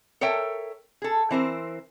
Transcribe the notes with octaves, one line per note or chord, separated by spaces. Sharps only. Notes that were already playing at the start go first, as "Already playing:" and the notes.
A4 A#4 C#5 E5 G5
G#4 A4
E3 C4 A#4 C5